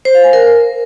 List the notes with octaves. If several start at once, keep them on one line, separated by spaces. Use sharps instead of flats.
C5
F5
G#5
A#4